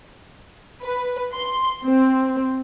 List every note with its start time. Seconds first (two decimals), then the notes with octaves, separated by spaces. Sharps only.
0.83 B4
1.32 C6
1.83 C4